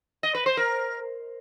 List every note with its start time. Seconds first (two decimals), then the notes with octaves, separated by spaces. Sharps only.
0.23 D#5
0.35 B4
0.46 C5
0.57 A#4